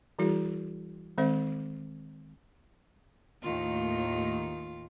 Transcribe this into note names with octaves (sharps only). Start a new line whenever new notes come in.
E3 G3 E4 F#4 G#4
D#3 G#3 C4 C5 E5
D#2 A2 D#3 F4